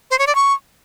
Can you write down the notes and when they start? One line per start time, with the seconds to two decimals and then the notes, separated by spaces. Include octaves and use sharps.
0.11 C5
0.19 C#5
0.27 D5
0.35 C#6